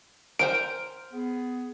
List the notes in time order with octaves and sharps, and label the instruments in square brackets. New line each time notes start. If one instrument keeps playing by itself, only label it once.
[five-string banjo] A#4 C5 G5 [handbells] D7
[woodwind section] B3 G#4